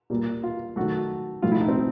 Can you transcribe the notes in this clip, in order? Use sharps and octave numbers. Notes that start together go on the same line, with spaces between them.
A#2 G3 A#3
F4
D#3 F#3 A3 F#4
A2 F3 A3 F4
E4
D#4
C4